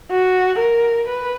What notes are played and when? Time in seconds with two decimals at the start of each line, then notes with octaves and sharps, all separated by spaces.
0.11 F#4
0.59 A#4
1.08 B4